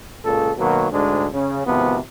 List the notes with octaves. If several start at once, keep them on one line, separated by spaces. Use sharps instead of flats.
C#2 A#2 C#3 A4
B2 D#3 F#3 A#3
D2 G#2 G#3 D4
C#3
G#1 C3 F3 B3